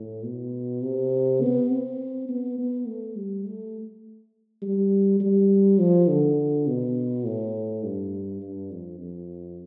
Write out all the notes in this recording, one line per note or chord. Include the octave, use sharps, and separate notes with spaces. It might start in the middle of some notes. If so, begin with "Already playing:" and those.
Already playing: A2
B2
C3
B3
C4
B3
B3
A3
G3
A3
G3
G3
F3
D3
B2
A2
G2
G2
F2
F2